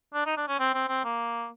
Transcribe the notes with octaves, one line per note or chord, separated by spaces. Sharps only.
D4
D#4
D4
C#4
C4
C4
C4
A#3